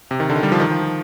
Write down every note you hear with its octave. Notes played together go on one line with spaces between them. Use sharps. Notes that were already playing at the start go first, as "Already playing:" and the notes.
C3
D#3
D3
D#3
G3
F3
D#3
F3
F3